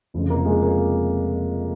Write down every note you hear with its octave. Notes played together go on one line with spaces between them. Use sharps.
F1 F2 C#3 F3
A#3
G#3
A#3